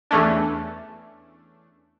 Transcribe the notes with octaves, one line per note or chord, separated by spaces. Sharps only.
E2 E3 A3 C#4 D4